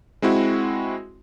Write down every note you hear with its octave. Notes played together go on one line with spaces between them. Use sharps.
G#3 C4 E4 F#4